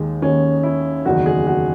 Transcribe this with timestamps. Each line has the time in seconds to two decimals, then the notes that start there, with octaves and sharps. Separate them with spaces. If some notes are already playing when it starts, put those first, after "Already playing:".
Already playing: D#2 D#3 G#3
0.22 D#2 D#3 C#4
0.63 E4
1.05 F#1 E2 D#3 F#4
1.26 G#4
1.47 F#4